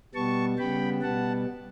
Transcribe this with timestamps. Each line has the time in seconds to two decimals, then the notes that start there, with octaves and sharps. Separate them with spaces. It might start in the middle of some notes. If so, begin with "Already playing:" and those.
0.14 B2 G3 B3 A5 C#6
0.58 C#3 G3 B3 G5 B5
1.02 B2 G3 B3 F#5 A5